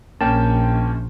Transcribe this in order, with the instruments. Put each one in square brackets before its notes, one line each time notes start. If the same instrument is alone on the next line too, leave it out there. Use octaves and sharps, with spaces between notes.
[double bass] A#1 [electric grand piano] A#3 C#4 G5 [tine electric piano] A5